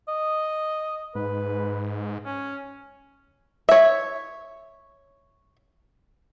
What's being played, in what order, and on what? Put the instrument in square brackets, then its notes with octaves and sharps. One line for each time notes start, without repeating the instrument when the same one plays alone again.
[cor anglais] D#5
[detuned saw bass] G#2 [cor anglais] B4
[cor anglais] C#4
[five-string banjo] C#5 E5